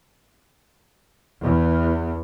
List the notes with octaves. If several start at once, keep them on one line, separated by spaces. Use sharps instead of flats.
E2